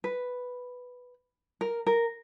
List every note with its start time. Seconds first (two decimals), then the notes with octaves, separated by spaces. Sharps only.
0.04 B4
1.61 A#4
1.87 A#4